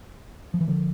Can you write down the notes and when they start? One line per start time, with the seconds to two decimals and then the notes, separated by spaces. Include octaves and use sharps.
0.54 F3
0.61 E3
0.68 D3 F3